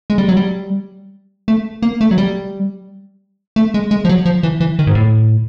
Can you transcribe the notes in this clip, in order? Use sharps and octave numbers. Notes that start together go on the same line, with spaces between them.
G#3
G3
F#3
G3
A3
A#3
A3
F#3
G3
A3
G#3
G#3
F3
F#3
F3
E3
E3
D#3
G#2
A2